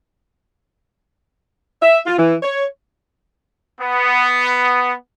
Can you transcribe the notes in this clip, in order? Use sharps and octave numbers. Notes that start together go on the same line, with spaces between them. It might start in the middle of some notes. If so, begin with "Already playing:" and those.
E5
F4
E3
C#5
B3